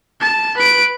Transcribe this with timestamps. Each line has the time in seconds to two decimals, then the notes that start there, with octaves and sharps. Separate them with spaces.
0.20 A5
0.57 B4 D7